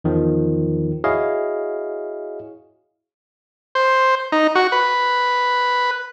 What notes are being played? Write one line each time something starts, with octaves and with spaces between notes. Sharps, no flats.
E2 D#3 F3
E4 F#4 G#4 C#5 D#5 F5
C5
D#4
F#4
B4